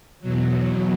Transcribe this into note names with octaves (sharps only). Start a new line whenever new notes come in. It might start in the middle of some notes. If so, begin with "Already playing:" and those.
E2 B2 F#3